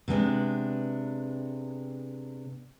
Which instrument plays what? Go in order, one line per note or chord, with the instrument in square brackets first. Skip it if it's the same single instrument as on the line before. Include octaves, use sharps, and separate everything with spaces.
[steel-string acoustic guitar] C3 G#3 B3 D4